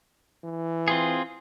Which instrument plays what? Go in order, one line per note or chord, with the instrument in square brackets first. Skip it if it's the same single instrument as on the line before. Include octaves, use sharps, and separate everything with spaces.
[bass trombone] E3
[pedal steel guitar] C4 F4 G#4